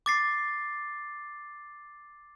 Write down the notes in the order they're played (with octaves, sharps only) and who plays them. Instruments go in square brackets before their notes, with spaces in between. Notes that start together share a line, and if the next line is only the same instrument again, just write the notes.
[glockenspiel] D6 A6 C7